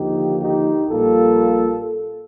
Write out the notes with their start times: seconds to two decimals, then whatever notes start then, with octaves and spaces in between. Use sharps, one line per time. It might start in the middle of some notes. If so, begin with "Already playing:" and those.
Already playing: D#2 D3 F3 A#3 D#4 G4
0.41 D#4 G4
0.90 A#1 A#2 G3 A#3 F4 A4